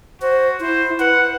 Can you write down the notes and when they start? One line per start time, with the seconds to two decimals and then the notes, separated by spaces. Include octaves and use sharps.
0.22 F#4 C5
0.60 E4 C5
1.00 B4 F#5